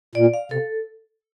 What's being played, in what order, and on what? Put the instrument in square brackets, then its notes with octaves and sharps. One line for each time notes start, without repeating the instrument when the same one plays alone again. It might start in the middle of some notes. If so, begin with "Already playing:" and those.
[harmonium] A#2 [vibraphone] D5
[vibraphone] F5
[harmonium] C3 [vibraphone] A4